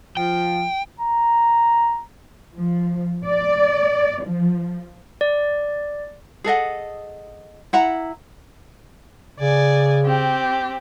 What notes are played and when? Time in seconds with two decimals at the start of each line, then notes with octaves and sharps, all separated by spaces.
0.17 F3 G5
1.00 A#5
2.56 F3
3.26 D5
4.25 F3
5.21 D5
6.44 G#4 A4 D#5 F#5
7.73 E4 F#5 A#5
9.39 C#3 D5 G#5
10.05 C4 G4